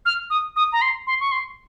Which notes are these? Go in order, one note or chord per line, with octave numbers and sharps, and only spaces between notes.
F6
D#6
D#6
A#5
C6
C6
C#6
C6